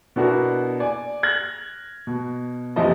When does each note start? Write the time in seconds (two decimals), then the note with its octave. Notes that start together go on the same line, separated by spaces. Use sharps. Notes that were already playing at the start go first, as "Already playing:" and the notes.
0.16 B2 B3 D4 E4 F#4 A#4
0.80 D5 G#5
1.23 F6 F#6 G#6 A#6 F#7
2.07 B2
2.76 F2 C3 E3 F3 D#5 A5